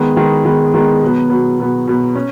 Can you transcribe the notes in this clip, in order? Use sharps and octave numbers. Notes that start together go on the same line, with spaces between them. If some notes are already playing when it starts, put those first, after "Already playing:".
Already playing: D#3 G#3 B3
D#3 G#3 B3
D#3 G#3 B3
D#3 G#3 B3
B2 F#3 B3
B2 F#3 B3
B2 F#3 B3
B2 F#3 B3
C#4